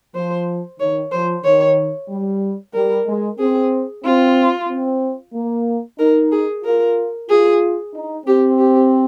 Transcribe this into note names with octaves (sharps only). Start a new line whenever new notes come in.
F3 C5
D#3 C#5
F3 C5
D#3 C#5
G3
G3 A#4
G#3
C4 G#4
C4 F4
C4
A#3
D#4 A#4
G#4
F4 A#4
F4 G#4
D#4
C4 G4
G4